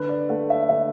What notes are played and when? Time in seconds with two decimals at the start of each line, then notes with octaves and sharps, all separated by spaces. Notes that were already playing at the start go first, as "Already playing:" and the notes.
Already playing: D3 B4
0.09 D5
0.29 A3 F#5
0.50 E5
0.69 D3 E5